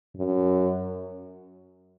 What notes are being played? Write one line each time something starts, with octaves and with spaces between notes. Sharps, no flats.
F#2